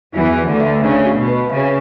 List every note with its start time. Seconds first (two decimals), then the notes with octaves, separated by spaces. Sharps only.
0.16 E2 E3 F#4
0.39 B4
0.49 D2 D3
0.60 E5
0.83 C#3 D4
1.06 F#4
1.16 B2
1.28 B4
1.50 C#3 E5